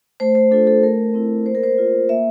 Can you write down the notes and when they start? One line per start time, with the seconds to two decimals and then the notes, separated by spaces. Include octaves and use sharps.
0.20 A3 C5
0.35 C5
0.51 D4 F4 A4
0.67 A4
0.83 A3 A#4
1.14 C4 E4
1.46 A#3 C5
1.55 A#4
1.63 C5
1.78 F4
2.09 A#3 E5